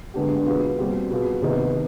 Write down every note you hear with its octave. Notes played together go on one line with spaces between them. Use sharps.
D3 G#3 B3 D4 G4
B2 B3 F4 G#4
B2 G3 C4 G4
B2 B3 F4 G#4
C3 D#3 B3 D#4